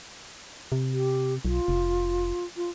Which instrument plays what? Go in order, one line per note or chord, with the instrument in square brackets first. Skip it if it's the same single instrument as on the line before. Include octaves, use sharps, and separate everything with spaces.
[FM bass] C3
[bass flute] G4
[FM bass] B1 [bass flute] F4
[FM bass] F1
[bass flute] F4